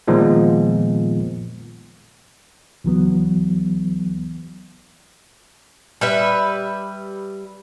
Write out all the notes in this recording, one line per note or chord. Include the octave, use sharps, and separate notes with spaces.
A#2 D#3 F3 G#3 B3
C#2 E3 F#3 B3
G3 B4 E5